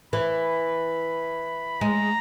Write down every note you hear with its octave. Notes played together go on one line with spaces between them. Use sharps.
E3 B5
G#3 A#5